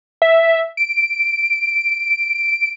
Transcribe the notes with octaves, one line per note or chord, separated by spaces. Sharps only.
E5
D7